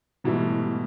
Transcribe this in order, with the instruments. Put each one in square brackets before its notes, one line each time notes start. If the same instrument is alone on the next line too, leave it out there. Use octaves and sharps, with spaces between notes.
[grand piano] G#2 B2 E3 G3 A3